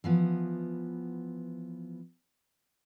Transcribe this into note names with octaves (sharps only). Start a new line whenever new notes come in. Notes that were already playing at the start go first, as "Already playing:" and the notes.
E3 F3 B3